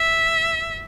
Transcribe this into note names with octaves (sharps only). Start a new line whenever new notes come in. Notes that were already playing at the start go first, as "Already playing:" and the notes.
Already playing: E5